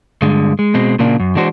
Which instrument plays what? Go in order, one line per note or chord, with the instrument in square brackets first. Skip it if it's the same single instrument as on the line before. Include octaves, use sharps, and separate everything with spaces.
[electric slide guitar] G2 D3 G#3
G#3
B2 G#3 C4
A#2 C#3 A#3 D4
F#2
E3 G#3 D4 F#4 C5